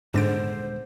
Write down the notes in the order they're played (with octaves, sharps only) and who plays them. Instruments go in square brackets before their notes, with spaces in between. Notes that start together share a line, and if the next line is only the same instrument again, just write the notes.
[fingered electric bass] D#1 G#3 B3 [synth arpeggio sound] G#2 A6 D7 [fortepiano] D3 [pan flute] C5